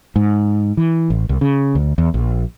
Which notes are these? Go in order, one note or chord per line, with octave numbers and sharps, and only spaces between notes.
G#2
E3
A1
C2
C#3
D2
E2
A#1